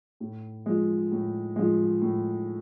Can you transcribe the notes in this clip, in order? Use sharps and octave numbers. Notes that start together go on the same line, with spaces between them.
A2
F3 G#3
A2
F3 G#3
A2